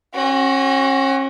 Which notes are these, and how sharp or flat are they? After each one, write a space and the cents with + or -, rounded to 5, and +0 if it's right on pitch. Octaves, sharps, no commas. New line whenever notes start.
C#4 -40 F#4 +15